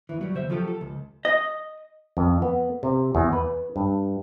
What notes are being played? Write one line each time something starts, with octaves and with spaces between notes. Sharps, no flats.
D#2 E3
F#3 G3
D#2 C#3 C5 E5
F3 F#3 F4 G4 A4
A4
C#2
D#5
F2
B3
C3
E2
B4
G2